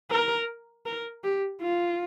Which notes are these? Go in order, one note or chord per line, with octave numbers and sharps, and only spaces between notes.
A#4
A#4
G4
F4